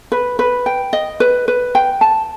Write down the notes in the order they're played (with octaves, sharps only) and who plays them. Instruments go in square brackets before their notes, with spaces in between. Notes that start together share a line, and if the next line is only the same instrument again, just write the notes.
[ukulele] B4
B4
G5
D#5
B4
B4
G5
A5